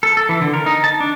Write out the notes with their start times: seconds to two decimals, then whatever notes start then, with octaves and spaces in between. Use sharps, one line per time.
0.03 A4
0.17 A4
0.29 E3
0.42 D3
0.54 A#4
0.66 D#4
0.84 A5
1.00 D4